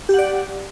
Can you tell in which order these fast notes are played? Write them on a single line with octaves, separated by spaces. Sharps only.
G4 F#5 D5